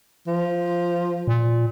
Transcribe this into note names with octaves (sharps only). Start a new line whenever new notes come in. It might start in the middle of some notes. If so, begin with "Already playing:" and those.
F3
A#2